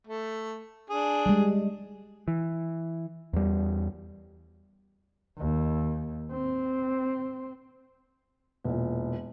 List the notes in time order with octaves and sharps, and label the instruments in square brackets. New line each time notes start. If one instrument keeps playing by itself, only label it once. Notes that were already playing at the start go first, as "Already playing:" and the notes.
[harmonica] A3
D4 G#4
[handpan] G3 G#3
[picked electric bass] E3
E2 G3
[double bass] D#2
C4
[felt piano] E1 A#2